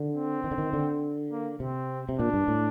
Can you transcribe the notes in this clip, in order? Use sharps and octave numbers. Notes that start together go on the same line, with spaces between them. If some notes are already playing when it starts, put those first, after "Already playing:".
Already playing: D3
C4
D#3
D3
D#3
D3
A#3
C3 C4
C3
A#2 D4
G2
A2